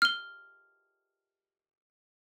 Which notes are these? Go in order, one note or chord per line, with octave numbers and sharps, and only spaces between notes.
F6 G7